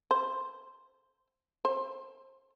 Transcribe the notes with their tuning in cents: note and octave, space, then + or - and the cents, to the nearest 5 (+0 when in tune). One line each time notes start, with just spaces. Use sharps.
C5 +0
C5 +30